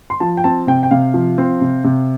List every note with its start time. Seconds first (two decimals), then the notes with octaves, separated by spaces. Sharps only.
0.10 C6
0.20 F3 A5
0.37 G5
0.44 C4 A5
0.67 C3 G5
0.83 G5
0.91 C3 F5
1.14 F3
1.38 C4
1.61 C3
1.84 C3